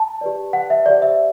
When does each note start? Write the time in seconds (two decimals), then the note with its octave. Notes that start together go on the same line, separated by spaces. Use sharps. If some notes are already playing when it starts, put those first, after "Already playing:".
Already playing: A5
0.21 G4 B4 D5
0.53 F#5
0.70 E5
0.86 G4 C5 D5
1.02 E5